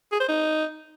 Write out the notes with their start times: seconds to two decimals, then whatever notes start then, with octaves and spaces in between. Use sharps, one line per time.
0.12 G#4
0.20 C5
0.28 D#4